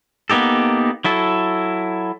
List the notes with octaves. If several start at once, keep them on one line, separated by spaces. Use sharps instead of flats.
A#3 B3 D#4 G4 A4
F#3 E4 A4